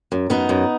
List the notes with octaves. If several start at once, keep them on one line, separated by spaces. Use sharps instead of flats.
F#2
F#2 B3 D#4
F#2